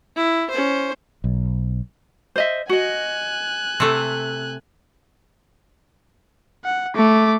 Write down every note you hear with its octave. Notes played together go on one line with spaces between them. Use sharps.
E4
C#4 C5
B1
C5 D#5 E5
F#4 D#5 G#5 F#6
C3 A3
F#5
A3 D6